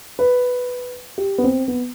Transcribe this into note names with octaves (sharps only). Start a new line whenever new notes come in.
B4
G4
B3
C4
B3